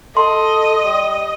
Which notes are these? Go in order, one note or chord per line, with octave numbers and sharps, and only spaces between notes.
A4 D#5 C6
G3